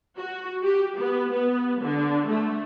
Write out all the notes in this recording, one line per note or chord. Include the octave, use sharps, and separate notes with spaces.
F#4
G4
B3
B3
D3
A3